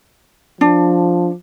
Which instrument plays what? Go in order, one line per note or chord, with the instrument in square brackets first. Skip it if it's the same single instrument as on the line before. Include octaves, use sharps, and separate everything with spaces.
[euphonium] F3 [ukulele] D4